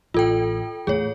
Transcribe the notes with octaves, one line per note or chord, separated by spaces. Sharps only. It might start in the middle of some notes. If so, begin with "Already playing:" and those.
A1 F4 A4 G5
E2 A2 G#4 C#5